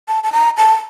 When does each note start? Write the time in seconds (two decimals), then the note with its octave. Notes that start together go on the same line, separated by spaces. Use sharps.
0.08 A5
0.24 A5
0.33 A#5
0.57 A5